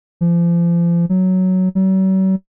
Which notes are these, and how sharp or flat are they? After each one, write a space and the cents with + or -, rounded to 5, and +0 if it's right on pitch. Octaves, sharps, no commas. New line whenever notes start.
F3 -35
F#3 +5
F#3 +45